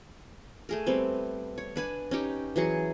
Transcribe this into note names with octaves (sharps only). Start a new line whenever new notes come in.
A3 G#4 A#4
G3 B3 C4 B4
C#5
D4 B4 G#5
C#4 D#4 G4
E3 F#3 G#4 C#6